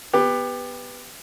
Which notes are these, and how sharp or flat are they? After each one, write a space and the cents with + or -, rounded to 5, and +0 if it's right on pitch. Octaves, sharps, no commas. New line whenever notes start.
B3 +0 G4 +20